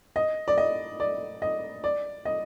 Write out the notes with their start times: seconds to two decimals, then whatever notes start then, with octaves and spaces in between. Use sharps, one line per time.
0.16 D#5
0.48 D5
0.58 D#5
1.00 D5
1.42 D#5
1.84 D5
2.25 D#5